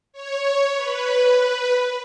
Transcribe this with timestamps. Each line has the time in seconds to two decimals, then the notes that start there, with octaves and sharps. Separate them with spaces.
0.13 C#5
0.76 B4